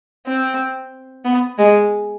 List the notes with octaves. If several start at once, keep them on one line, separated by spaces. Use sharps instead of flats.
C4
B3
G#3